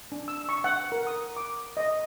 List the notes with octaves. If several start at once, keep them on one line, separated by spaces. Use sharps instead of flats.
D4
E6
C#6
F#5
A#4
D#6
D6
D#5